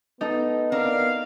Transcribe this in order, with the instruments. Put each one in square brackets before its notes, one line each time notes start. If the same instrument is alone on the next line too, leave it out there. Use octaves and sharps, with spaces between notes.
[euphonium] B3 [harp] D#4 A4
[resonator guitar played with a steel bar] C4 D4 A#4 [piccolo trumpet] F5